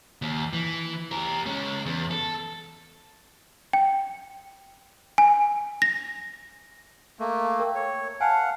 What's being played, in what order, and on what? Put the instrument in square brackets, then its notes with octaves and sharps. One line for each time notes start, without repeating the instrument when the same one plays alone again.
[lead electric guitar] D#2
E3
G4 A#4
G#3 C#4
E2
A4
[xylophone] G5
G#5
A#6
[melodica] A3 A#3
[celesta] A#4 G5
[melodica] C#5
[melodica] F5 F#5 [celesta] G#5 A5